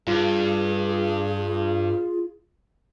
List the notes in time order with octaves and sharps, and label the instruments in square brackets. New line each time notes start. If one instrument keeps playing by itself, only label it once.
[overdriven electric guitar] G2 [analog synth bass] F4 [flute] G#4